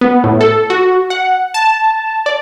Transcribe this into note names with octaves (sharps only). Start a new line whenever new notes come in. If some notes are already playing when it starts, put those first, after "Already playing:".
B3
A2
A4
F#4
F#5
A5
D5